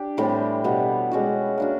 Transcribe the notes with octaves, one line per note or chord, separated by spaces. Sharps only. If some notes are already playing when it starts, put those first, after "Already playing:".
Already playing: D4 G4
A2 E3 G3 C4
B2 G3 B3
G#3 C#4 F#4
A#3 D4 F#4